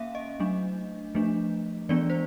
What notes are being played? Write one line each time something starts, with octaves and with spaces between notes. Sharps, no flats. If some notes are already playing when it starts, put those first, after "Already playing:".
Already playing: A#3 C#4 E5 F5
D#5
F#3 A3 D4
F3 A3 D4
E3 G#3 B3 D4 D5
C5